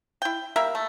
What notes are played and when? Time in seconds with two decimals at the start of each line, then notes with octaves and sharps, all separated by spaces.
0.22 E4 G5
0.56 G3 A#3 A#4 E5
0.75 A3